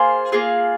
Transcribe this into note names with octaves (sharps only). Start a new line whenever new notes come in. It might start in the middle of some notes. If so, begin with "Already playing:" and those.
Already playing: A#3 F4 G#4 C5
A#3 F4 G#4